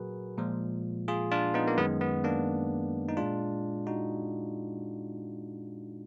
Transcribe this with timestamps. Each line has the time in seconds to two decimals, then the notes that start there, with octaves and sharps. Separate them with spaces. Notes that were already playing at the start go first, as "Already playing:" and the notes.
Already playing: A#2 F#3 F#4 G#4 A#4 B4
0.38 A#2 F3 G#3
1.08 F4 G#4
1.31 D4 F4
1.54 B3 D#4
1.67 A#3
1.78 F#2 D#3 G#3 B3
2.01 B3
2.24 A#3 D4
3.09 D#4
3.17 A#2 G#3 D4 F4
3.87 D#4 F#4